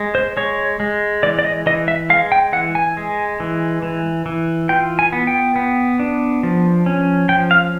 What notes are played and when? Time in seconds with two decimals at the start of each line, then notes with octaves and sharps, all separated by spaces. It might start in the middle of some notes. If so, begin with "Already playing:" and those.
Already playing: G#3
0.15 C5
0.37 G#3 C#5
0.80 G#3
1.23 E3 D5
1.39 D5
1.44 D#5
1.66 E3 D#5
1.88 E5
2.10 G#3 F5
2.32 G5
2.53 E3 F#5
2.75 G#5
2.97 G#3
3.40 E3
3.82 E3
4.26 E3
4.69 F4 G5
4.99 G#5
5.13 B3
5.27 G5
5.56 B3
5.99 D4
6.43 F3
6.86 C#4
7.29 F3 G5
7.51 F5